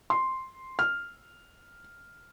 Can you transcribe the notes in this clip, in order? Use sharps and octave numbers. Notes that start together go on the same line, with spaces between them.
C6
F6